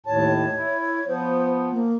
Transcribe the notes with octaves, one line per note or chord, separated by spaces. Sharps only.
D#2 A2 C#5 A5
E4
F3 B3 C5
A#3